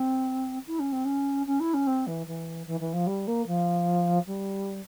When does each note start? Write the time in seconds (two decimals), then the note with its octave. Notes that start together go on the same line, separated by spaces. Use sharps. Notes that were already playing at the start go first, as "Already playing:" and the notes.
Already playing: C4
0.67 E4
0.79 C#4
0.92 C4
1.05 C#4
1.46 C#4
1.60 E4
1.73 C#4
1.87 C4
2.06 E3
2.26 E3
2.66 E3
2.80 E3
2.93 F3
3.06 G3
3.27 A#3
3.47 F3
4.26 G3